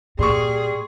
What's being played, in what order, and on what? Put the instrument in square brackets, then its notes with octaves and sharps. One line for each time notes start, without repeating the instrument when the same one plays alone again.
[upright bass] A#2 [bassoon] G3 [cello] G#4 [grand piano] C6 C#6